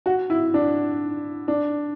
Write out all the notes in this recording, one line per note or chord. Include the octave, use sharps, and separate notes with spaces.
F#4
E4
D4
D4